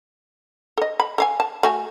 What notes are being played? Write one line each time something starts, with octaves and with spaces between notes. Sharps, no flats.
A4 D#5
B5
A4 F5 G#5
A5
A3 F#4 G#5